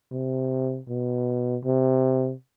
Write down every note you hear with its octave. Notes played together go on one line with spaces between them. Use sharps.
C3
B2
C3